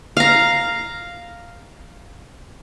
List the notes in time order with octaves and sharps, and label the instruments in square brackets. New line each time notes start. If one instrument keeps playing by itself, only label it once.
[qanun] F5 A#5